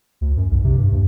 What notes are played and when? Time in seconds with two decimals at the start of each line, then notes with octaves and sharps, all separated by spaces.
0.21 D2
0.37 F#2
0.51 B1
0.64 C3
0.77 G2
0.92 D#2